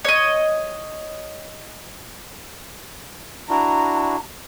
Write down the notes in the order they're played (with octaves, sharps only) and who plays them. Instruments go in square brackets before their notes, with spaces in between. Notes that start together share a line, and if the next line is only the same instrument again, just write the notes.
[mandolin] C#5 D#5
[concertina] D4 E4 F#4 [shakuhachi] A#5